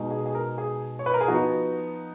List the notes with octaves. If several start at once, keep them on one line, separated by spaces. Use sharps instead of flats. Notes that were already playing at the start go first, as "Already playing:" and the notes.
Already playing: B2 G#3 D#4
G#4
G#4
A#4
G#4
C#5
B4
A#4
G#4
F3 B3 D#4 F#4